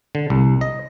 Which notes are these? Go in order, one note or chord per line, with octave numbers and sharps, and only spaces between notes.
D3
C2
D#5